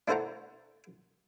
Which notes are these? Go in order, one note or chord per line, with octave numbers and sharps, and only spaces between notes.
D4 E4 A4 C5 F#5 A#5